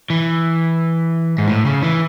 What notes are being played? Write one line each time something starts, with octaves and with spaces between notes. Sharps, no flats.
E3
G#2
A2
C#3
E3